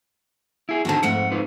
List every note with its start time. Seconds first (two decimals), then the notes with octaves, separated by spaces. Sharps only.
0.69 E4 G#4
0.85 E2 D3 D#3 C4 F#4 A5
1.03 F2 G#2 A3 F#5
1.32 D#4 F4 B4